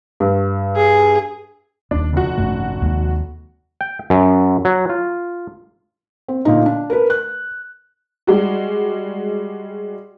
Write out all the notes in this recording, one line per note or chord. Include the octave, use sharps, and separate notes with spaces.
G2
G#4
D#1 D#2 D4
F1 F#4
G#1 F#2 A3
D#2 G#3
G5
F#2
F#3
F4
C4
A#2 D3 D#4
D4
A#4 B4
F#6
G3 G#3 F#4